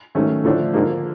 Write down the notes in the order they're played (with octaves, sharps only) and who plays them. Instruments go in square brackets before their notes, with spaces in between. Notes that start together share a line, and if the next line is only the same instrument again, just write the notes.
[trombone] G#2 [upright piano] D#3 F#3 A3 C#4
[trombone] A2 [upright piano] D3 F3 A3 D4
[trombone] G#2 [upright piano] D3 F3 A#3